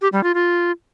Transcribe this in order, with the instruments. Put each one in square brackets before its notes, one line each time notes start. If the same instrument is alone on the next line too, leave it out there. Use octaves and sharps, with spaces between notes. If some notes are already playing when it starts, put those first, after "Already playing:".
[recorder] G4
G3
F4
F4